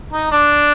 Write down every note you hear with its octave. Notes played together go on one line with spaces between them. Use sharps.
D#4
D4